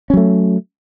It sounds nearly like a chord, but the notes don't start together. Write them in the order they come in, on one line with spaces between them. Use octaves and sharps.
C#4 F#3 A3